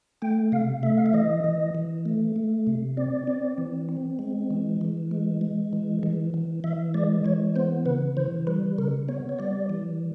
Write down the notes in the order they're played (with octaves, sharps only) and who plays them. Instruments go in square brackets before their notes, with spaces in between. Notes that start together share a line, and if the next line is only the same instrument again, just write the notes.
[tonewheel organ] A3 G5
C3 F5
A3 E5
F5
E5
E3 D#5
E3
E3
A3
A3
C3
C4 D5
C4
E3
C4
G#3
E3
E3
G#3
G#3
E3
E3
E3
E3 E5
G#3 D5
E3 C#5
B3 C5
C#3 B4
E3 C5
G3 B4
C#3 A#4
B3 C#5
C#5
G3 D5
E3